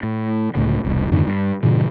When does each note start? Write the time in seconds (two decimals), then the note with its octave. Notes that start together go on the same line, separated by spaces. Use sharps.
0.03 A2
0.55 C#2 A2 D3
0.84 E1 C2
1.11 F2 G#2 D3 D#3
1.27 G2
1.63 G2 A#2 C#3 E3